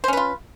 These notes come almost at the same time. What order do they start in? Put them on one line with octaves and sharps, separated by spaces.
C5 C#4 B4 F4